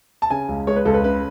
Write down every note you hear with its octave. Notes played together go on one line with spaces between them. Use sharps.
A5
C#3 G#5
C#2
G#3 C#5
B4
C#2 A4
B4
C#3 B4